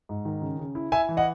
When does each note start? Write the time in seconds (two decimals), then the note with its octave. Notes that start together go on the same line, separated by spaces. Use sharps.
0.09 G#2
0.25 D#3
0.42 C#3
0.59 C#3
0.75 E4
0.92 E4 E5 G#5
1.09 E3
1.17 D#5 F#5